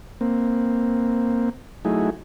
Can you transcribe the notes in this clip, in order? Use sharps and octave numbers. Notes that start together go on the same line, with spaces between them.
A#3 C4
F#3 A3 D#4 E4 G#4